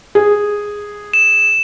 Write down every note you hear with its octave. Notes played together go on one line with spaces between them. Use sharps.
G#4
E7